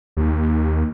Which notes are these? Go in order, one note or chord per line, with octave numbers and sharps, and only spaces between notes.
D#2